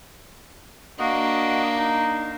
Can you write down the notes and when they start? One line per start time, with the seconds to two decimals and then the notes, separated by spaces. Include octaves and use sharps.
0.99 A#3 D4 F#4 D#5
1.77 D#4